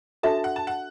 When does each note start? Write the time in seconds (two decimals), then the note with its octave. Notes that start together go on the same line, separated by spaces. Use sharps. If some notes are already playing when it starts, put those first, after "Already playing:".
0.23 D4 F#4 A4 E5 A5
0.44 F#5
0.56 A5
0.67 F#5